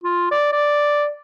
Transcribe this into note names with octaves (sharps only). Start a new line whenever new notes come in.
F4
D5
D5